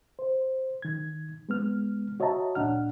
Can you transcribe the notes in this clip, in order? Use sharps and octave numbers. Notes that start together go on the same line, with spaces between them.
C5
D#3 G#6
G#3 B3 F6
F#4 C#5 D#5 E5 A5 A#5
D2 A#2 D4 F#5 F6